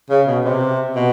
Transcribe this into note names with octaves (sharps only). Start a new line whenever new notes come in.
C#3
B2
C3
B2